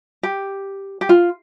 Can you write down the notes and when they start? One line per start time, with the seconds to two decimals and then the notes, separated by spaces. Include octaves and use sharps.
0.23 G4
1.01 G4
1.09 F4